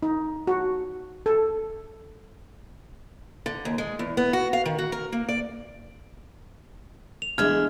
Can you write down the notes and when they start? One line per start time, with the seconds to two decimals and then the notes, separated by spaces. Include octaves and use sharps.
0.03 D#4
0.47 F#4
1.26 A4
3.46 D3
3.65 D#2
3.78 G#3
3.99 E2
4.17 B3
4.33 F#4
4.53 F5
4.65 D#3
4.79 F#4
4.92 A#4
5.12 A#3
5.29 D5
7.22 F7
7.38 E2 D3 G#3 E5 F6 G#6